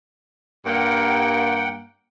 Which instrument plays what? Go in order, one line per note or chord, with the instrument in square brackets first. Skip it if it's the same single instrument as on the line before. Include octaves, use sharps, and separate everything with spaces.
[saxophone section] G2 A#3 [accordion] F#5 G5